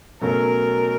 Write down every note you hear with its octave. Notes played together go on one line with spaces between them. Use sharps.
B2 F#3 A3 C#4 A#4